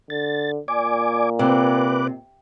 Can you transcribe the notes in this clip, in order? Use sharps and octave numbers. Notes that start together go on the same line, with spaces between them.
D3 A6
A#2 D5 G#5 D6
C3 B4 D6 F#6